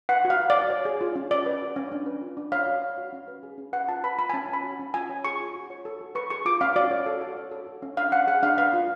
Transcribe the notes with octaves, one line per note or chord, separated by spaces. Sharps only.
B4 F#5
F#4
F5
B4
D5
F#4
C#5
G#4
F4
C#4
C#4 D5
B4
F#4
C#4
D4
B4
F4
D4
C#5 F5
F#4
C#5
F#4
C#4
B4
G#4
C#4
B4 F#5
F4 A5
B4 B5
F4 B5
G#5
C#4 A5
C#5 B5
F#4
C#4
F4 G#5
C#5
G#4 C#6
F4
F#4
C#5
A4
F#4
B4 C#6
G#4 C#6
F4 D6
C#4 F5
F#4 D5
C#5
A4
F#4
C#5
A4
F#4
C#4
D4 F5
C#5 F#5
G#4 F#5
D4 F5
B4 F5
F4